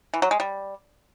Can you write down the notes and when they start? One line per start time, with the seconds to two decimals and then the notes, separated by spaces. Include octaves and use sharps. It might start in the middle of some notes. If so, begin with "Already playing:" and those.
0.14 E3
0.22 F#3
0.31 G#3
0.40 G3